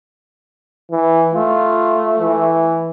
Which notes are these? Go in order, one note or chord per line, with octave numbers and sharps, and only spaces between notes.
E3
A3 F4
E3